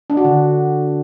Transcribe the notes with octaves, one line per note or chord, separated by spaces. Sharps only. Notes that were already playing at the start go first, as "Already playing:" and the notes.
D4
F#4
D3